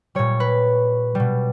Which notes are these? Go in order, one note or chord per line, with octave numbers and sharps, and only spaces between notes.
A#2 G3 C#5
B4
B2 G3